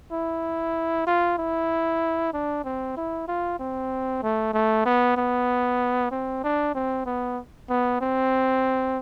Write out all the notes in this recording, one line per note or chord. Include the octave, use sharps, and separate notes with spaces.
E4
F4
E4
D4
C4
E4
F4
C4
A3
A3
B3
B3
C4
D4
C4
B3
B3
C4